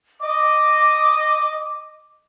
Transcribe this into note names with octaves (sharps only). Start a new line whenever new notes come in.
D#5 D6